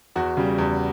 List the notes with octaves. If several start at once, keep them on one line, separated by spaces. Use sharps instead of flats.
E2 F#4
C#3 G3
E2